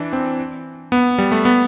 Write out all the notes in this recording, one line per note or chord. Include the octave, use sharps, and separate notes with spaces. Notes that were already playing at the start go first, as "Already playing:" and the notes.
Already playing: E3 D4
C4
B3
G3
A3
B3